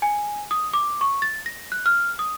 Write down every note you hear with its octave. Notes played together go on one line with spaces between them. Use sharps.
G#5
D#6
D6
C#6
A6
A#6
F#6
F6
D#6